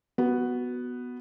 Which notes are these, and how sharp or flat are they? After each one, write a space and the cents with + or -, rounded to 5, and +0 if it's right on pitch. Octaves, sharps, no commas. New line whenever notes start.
B3 +0 F#4 +0